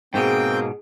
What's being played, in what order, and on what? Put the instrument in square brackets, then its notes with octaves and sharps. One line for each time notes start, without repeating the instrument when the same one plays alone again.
[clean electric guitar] G#2 B2 [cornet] A#3 [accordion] C4 G5 [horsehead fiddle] G#4